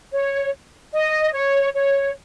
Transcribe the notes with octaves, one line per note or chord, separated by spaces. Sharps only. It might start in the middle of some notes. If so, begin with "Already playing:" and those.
C#5
D#5
C#5
C#5